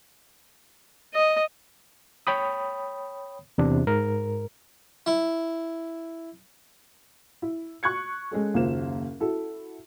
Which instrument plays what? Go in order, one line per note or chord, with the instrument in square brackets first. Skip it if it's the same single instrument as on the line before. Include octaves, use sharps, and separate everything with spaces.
[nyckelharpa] D#5
[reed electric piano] C#5 G5 B5 D#6
E2 C3 D4
G#2 A#4
[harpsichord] E4
[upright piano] E4
C#6 F#6 G#6 C#7
G#3 C#4 A4
F#1 D#2 A#3 F4 C5 E7
E4 F#4 A4